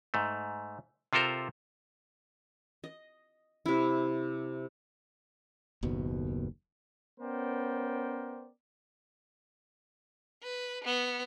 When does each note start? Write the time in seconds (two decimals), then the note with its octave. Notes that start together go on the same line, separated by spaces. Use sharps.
0.14 G#2 A3
1.13 C3 F4 A4 A#4 C5
2.84 D#5
3.66 C3 E4
5.83 F#1 D#2 B2
7.20 B3 C#4 A#4 C5 D5 G5
10.43 B4
10.85 B3